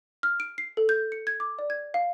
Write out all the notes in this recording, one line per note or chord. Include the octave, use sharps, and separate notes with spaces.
F6
D7
C7
A4
G6
C#7
G#6
D6
D5
G#6
F5